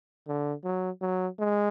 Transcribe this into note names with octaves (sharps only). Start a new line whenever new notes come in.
D3
F#3
F#3
G#3